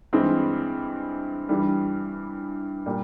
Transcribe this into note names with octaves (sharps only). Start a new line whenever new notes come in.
G2 E3 G#3 C4
G2 E3 G3
A#2 G3